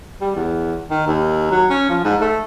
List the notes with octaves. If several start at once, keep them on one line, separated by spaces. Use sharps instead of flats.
G3
E2
D#3
D#2
F#3
C#4
F3
G#2
A3